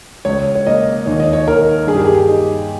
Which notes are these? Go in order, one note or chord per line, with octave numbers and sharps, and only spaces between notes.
C#2 C#5
C#5
A#3 D#5
D#2 C#5
D#5
C#5
D#2 A#4
G2 G#4
G4
G#4
D#4